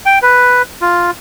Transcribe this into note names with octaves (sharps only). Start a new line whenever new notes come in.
G5
B4
F4